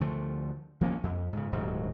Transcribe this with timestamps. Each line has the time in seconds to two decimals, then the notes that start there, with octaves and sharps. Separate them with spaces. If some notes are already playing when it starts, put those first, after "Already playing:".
0.01 D2 D3 F3 A3
0.81 F3 A#3 C4 C#4
1.03 F2
1.33 G#2 C#3
1.52 D#1 D2 G#2 F#3